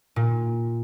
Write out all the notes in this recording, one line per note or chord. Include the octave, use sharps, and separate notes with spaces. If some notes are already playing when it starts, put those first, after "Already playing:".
A#2